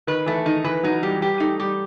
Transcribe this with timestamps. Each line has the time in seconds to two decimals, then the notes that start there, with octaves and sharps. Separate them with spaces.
0.07 D#3 B4
0.26 E3 A3
0.46 D#3 D#4
0.64 E3 B4
0.83 F#3 D#4
1.03 G3 G4
1.21 G3 G4
1.40 A3 D#4
1.60 G3 G4